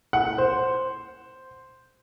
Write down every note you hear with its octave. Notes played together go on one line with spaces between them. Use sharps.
F#5
C5